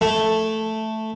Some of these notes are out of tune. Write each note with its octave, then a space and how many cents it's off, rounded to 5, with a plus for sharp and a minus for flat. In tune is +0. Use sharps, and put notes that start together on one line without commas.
A3 +0 E4 +0